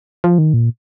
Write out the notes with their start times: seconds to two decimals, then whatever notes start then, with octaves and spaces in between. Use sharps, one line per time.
0.24 F3
0.38 D#3
0.54 A#2